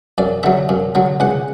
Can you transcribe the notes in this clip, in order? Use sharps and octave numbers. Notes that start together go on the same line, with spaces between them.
F#2 D5
D3 F#3 E5
F#2
D3 F#3
C#2 F#5